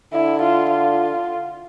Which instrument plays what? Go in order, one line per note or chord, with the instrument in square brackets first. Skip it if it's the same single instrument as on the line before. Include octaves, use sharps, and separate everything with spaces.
[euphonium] D3 [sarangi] E4
[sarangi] F4
F4